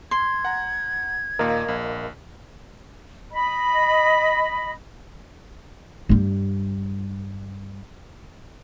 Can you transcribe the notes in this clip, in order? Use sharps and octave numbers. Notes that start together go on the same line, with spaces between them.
C6 G#6
F#5 A#5
D#2 A#2 A#4 D#5 F5
A#1
D#5 B5
G2 G3